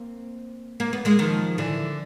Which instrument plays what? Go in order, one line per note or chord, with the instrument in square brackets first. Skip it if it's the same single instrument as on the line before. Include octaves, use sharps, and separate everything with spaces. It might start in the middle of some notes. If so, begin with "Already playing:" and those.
Already playing: [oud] A#3 C4
A#3
B3
G#3 A#3
D#3 F3
D3 E3